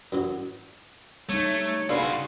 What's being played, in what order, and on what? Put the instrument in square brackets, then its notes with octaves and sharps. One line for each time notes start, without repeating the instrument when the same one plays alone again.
[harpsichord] F#2 E3 F#3
[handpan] G3 D#4 [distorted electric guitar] A3 [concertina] C#5
[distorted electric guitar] C#3 F#4 [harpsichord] D4 A4 B4 [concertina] F5 C6